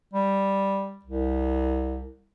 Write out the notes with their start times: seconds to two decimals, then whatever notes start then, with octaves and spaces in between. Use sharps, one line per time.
0.14 G3
1.05 C2